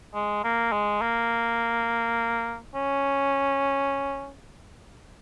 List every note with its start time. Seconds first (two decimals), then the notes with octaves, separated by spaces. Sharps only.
0.14 G#3
0.44 A#3
0.72 G#3
1.02 A#3
2.75 C#4